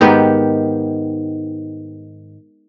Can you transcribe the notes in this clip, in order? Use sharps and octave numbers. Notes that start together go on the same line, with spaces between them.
G#2 D#3 B3 G4